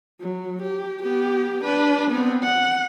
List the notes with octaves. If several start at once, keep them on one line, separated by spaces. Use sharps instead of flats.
F#3
G4
B3 G4
D4 B4
B3 C4
F#5